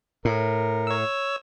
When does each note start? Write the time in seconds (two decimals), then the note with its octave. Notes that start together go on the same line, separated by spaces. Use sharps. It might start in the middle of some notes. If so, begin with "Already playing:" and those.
0.25 A2 A#4
0.87 C#5 E6